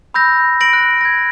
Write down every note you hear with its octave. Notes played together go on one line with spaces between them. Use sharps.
B5 E6 G6 A#6
A#6 D7 F#7
F#6
G#6 A#6